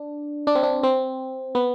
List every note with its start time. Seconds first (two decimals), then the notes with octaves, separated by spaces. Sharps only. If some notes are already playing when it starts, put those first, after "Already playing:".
Already playing: D4
0.47 D4
0.55 C4
0.63 D4
0.83 C4
1.55 B3